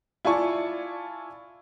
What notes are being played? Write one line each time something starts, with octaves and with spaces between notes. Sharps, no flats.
E4 F4 D5 G#5 A5 C#6